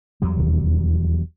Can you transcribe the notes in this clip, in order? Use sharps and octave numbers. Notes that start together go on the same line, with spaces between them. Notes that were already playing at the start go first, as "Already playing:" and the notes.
E2 F#3 G3
E1 D#2